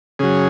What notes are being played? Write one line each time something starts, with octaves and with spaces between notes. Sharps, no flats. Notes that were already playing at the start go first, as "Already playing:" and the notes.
C#3 F#3 G#4